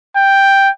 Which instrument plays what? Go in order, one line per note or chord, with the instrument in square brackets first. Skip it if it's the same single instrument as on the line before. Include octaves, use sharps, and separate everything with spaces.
[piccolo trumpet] G5